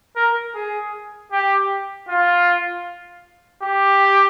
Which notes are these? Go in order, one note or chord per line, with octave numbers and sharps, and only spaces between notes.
A#4
G#4
G4
F4
G4